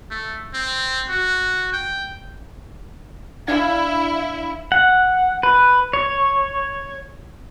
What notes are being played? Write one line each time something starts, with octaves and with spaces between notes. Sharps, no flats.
A3
C4
F#4
G5
D4 E4 F5 G#6
F#5
B4
C#5